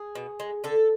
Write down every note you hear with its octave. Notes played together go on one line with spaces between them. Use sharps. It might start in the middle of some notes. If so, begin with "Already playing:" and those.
Already playing: G#4
B2
G#3
D3 A4